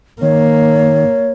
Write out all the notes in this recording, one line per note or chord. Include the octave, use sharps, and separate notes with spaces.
D#3 A#3 C#5